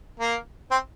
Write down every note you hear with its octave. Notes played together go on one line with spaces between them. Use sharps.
A#3
C4